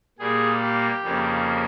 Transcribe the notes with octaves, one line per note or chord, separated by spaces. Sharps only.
A#2 G3 A#3 G#4
G4
F2 C#3 G3 A#3